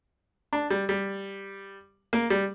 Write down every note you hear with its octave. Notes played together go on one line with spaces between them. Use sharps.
D4
G3
G3
A#3
G3